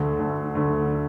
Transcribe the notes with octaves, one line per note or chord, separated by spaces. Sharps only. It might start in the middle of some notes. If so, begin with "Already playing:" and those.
Already playing: D2 D3 A3
D2 D3 A3
D2 D3 A3